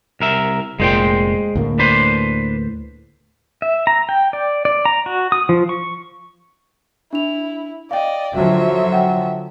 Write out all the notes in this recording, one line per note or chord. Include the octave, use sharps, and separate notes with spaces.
C2 A#4 E5
F1 A#2 G#3 C5 G5
D2 A2 A#3
D4 B4 C5
E5
A#5
G5
D5
D5
A#5
F#4
D#6
F3
C#6
D4 E4 F7
D5 D#5 F5 G5
D3 F3 F#3 E5
F#5 G5